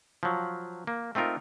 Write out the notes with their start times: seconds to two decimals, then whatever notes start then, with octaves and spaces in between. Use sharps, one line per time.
0.23 F3 F#3
0.87 A#3
1.15 A3 C4 D#4 F4 A#4